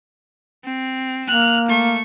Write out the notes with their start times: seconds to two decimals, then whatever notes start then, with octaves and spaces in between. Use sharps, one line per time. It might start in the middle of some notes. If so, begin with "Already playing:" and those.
0.64 C4
1.28 A#3 F6 F#6
1.69 A3 C#6